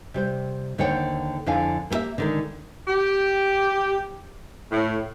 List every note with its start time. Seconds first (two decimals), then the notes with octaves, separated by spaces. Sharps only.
0.14 C3 G3 C5
0.78 D#2 D3 C5 C#5 F#5 G5
1.46 F2 D3 D4 E4 F5 G#5
1.90 A#3 B3 G4 A#4 E5
2.18 D3 D#3 G#3
2.88 G4
4.72 A2